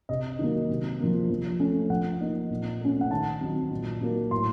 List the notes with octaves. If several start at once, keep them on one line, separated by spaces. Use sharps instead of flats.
C3 D#5
D#3 F#3 A#3
C3
F3 A#3
F3
A3 C#4
F3 F#5
A#3 D#4
A#2
A3 C#4
F#5
D#3 A5
F#3 C4 D#4
A#2
F#3 A#3 D#4
A2 C6